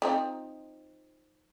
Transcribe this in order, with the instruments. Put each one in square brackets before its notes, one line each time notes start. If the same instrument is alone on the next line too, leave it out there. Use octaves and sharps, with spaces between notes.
[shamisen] F3 C4 D#4